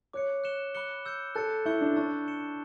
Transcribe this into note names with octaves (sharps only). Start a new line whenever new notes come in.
C#5 D6 F#6 C#7
F#6 C#7 E7 G7
B5 D6 F#6 C#7 G7
E6 G6 C#7
A4 F#6 A6 C#7
E4 C#6 E6 G6 C#7 G7
D4
D4 A5 C#6 E6 A6
G6 C#7 E7 G7